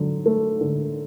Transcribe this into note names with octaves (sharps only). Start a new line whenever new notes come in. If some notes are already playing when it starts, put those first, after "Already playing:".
Already playing: D3 F#3
A3
D3